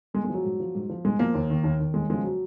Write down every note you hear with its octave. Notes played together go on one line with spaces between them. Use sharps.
G#2 G#3
G#3
F3 F#3
G#2
F3
G#2
F3
G#2 G#3
F3 A#3
D#2
D#3
D#2
D#3
D#2 G#3
C#3 F3 G#3
F#3